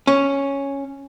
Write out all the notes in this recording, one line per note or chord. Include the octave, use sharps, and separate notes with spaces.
C#4